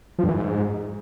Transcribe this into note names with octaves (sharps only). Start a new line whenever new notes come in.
F3
G2
E3
G#2